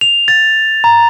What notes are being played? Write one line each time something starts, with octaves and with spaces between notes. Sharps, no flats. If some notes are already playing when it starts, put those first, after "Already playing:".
F7
A6
A#5